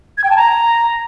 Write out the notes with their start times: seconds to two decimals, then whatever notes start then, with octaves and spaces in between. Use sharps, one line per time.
0.18 G#6
0.24 G5
0.30 A5
0.36 A#5